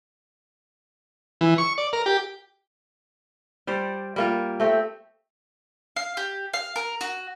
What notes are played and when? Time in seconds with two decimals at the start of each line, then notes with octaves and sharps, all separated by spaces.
1.41 E3
1.58 C#6
1.78 D5
1.93 A#4
2.06 G4
3.67 G3 C5 D5
4.16 G3 A#3 F4
4.60 A3 C4 G4
5.96 F5
6.17 G4
6.54 F5
6.76 A#4
7.01 F#4